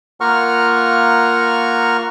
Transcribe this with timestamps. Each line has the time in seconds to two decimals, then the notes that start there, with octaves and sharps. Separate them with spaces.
0.21 A#3 F4 F#5 A#5 C#6 F6